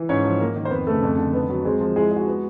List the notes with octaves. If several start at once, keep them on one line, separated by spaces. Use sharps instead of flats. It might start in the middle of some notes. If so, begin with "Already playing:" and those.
Already playing: E3
G#2 C#4 C#5
F3
A#3
D#3
C5
F2 B3 B4
C#3 A3 A4
F2
D3
D#3 B3 B4
F#3
G#3 C4 G#4
F3
G#3 E4 G#4
G#3
F#4
B3